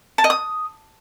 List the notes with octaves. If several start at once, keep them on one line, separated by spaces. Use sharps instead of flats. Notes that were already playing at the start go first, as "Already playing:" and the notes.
A5
D#5
D#6